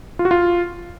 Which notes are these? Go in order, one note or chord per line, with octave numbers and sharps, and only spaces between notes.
F4
F#4
F4